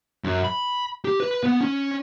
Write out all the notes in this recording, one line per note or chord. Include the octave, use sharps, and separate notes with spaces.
F#2
B5
G4
B4
B3
C#4